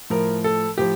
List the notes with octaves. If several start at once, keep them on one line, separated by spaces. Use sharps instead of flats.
A2 F3 A#4
A4
A2 F3 G4